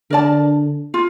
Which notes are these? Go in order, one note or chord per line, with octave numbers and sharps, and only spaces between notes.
D3 A#4 D5 A5
F4